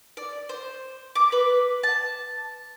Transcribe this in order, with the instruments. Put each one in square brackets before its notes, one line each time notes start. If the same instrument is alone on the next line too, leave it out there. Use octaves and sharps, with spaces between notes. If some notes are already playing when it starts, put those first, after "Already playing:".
[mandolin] D5
C5
D6
B4
A5